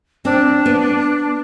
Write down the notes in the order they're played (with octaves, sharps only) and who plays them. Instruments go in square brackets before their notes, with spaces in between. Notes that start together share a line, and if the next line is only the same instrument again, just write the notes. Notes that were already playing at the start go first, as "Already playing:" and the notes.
[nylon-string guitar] C4 [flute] D4
[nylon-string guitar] B3